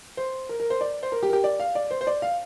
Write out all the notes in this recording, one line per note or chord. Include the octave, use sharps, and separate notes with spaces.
C5
A#4
A#4
C5
D5
C5
A#4
G4
A#4
G4
D5
F5
D5
C5
C5
D5
F5